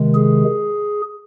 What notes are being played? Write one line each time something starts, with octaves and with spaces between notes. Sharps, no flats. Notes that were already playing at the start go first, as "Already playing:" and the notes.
Already playing: C3 D#3 G#3
G#4